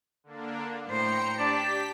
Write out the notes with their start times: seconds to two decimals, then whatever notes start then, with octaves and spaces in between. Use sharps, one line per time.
0.24 D3 A#3 D4
0.87 A2 C5 G5 A#5 C#7
1.38 D4 G4 D5 A5 B6